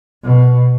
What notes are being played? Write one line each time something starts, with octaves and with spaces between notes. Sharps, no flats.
B2